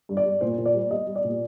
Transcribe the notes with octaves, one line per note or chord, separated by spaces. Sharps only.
G2
D5
G2
A#2 C5
A#2
D5
G3
G3 D#5
G3
D5
A#2